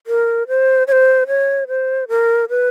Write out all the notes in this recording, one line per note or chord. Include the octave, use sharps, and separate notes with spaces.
A#4
C5
C#5
C5
C#5
C5
A#4
B4